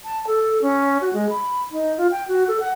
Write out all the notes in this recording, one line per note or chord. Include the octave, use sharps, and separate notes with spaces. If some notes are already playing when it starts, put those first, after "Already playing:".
A5
A4
C#4
F#4
G#3
B5
D#4
F4
G5
F#4
A4
F#5